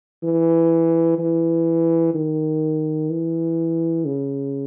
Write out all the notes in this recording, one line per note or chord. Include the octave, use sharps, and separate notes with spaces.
E3
E3
D#3
E3
C#3